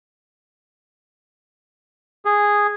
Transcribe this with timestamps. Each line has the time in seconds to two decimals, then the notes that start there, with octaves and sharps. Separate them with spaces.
2.25 G#4